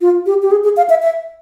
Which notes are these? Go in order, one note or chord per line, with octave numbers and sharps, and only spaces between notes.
F4
G4
G4
G#4
G#4
F5
E5
E5